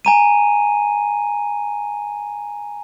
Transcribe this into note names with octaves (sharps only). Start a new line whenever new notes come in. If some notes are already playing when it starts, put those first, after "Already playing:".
G#5 A#5 D#7